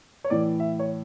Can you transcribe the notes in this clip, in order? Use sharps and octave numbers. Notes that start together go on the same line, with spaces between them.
C#5
A2 E3 D5
E5
C#5